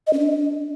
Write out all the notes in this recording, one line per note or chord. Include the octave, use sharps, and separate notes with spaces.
D#5
C#4
D4